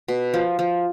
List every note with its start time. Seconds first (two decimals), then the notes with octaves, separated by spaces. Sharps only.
0.08 B2
0.34 F3
0.59 F3